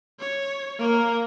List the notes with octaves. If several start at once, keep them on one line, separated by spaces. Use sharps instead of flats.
C#5
A#3 A#4